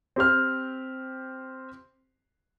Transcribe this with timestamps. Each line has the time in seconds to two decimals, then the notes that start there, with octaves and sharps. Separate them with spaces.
0.16 C4 G4 C5 F6